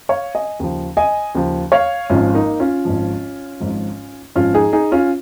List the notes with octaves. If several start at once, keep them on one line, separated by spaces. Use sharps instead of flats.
C#5 F5
D#5 G#5
D#2 C#3 F3
D#5 G#5
D#2 C#3 F3
C#5 F5
G#1 G#2 F3 C#4 F4
A#3 D#4
C#4 F4
G#1 G#2 F3
G#1 G#2 F3
G#1 G#2 F3 C#4 F4
D#4 G#4
D#4 G#4
C#4 F4